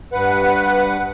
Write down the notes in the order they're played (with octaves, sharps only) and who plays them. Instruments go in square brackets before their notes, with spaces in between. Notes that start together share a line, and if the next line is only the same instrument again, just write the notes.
[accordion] G2 B4 F#5